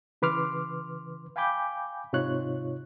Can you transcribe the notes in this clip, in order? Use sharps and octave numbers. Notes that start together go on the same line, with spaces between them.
C#3 E3 B4 C6 D6 F6
F5 G5 G#5 B5 D6 G6
G#2 C3 D#4 F4 C#5 F#6